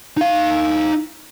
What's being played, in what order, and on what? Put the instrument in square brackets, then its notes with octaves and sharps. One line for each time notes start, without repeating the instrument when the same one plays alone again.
[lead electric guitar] D#4 F5